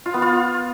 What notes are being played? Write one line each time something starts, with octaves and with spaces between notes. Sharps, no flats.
F4
B3
F4